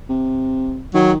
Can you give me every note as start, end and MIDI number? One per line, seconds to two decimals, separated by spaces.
0.09 0.83 48
0.95 1.18 51
0.95 1.12 54